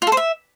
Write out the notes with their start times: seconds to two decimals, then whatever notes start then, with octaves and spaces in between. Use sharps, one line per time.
0.02 F4
0.07 A4
0.12 C5
0.17 E5